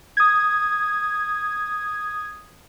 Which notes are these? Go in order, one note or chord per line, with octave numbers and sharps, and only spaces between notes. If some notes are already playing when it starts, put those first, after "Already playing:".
D#6 G#6